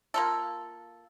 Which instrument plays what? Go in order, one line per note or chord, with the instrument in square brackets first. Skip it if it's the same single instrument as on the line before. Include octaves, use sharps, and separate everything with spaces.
[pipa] A#3 F4 A4